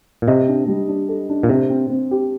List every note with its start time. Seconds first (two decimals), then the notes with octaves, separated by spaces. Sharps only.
0.22 A#2
0.28 C3 D#5
0.48 D4
0.67 G3
0.88 D4
1.09 A4
1.29 D4
1.43 A#2
1.49 C3 C4
1.70 C4
1.90 C4
2.11 G4